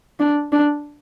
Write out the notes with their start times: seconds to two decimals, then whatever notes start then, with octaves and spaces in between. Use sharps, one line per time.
0.20 D4
0.52 D4